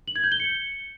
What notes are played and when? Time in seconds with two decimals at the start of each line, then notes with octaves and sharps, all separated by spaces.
0.08 F#7
0.16 G#6
0.24 G6
0.32 G7
0.40 C#7